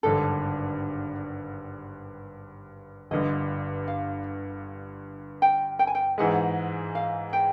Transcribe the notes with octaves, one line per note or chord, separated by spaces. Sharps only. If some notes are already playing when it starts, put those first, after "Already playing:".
G#1 G2 D3 A4
G1 G2 D3 D#5
F5
G5
G5
G#5
G5
G#2 E3 G#3 F#5
F5
G5